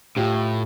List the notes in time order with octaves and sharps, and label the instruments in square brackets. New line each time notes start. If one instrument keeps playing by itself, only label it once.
[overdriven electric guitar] A2 [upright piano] F4 G4